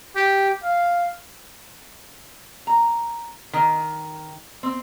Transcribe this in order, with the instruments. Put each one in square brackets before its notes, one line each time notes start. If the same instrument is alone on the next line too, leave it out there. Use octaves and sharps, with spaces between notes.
[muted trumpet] G4
F5
[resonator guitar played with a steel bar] A#5
D#3
C4